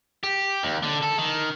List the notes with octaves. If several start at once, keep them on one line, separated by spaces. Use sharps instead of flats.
G4
D#2
D3
A4
D#3